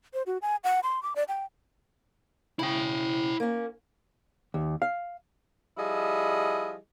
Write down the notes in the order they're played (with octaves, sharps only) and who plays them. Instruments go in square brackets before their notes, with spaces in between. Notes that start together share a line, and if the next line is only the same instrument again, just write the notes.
[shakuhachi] C5
F#4
G#5
F#5
C6
D6
D5
G5
[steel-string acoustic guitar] A2 C#3 [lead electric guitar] E4 G5
[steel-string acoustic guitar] A#3 C#4
[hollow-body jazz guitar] D#2
F5
[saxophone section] F3 G3 E4 G#4 D#5